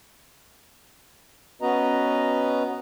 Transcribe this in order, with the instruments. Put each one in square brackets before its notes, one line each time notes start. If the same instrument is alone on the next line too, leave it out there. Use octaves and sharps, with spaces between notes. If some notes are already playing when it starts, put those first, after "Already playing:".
[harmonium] B3 C#4 F#4 B4 D#5 A#5